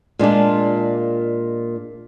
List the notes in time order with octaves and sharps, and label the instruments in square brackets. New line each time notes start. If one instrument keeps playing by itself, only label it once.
[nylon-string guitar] A#2 G#3 D4 F4